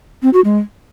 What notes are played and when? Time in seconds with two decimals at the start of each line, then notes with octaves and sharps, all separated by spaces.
0.23 C4
0.33 F#4
0.44 G#3